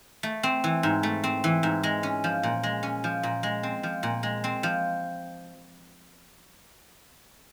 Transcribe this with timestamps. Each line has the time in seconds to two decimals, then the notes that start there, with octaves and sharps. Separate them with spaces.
0.23 A3
0.43 C4
0.64 E3
0.83 G#2
1.03 A3
1.24 C4
1.44 E3
1.63 G#2
1.83 G#3
2.03 C#4
2.24 F3
2.43 A#2
2.63 G#3
2.83 C#4
3.04 F3
3.23 A#2
3.43 G#3
3.63 C4
3.83 F3
4.03 A#2
4.23 G#3
4.44 C4
4.63 F3